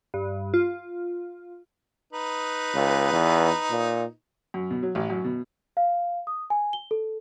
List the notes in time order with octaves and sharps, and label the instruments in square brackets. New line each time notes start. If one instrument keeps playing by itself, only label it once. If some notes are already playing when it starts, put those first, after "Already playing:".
[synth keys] G2
F4
[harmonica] D#4 B4
[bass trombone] C#2
E2
A#2
[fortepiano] F#2
B2
F#3
A1
F#2
B2
[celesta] F5
D#6
G#5
G7
A4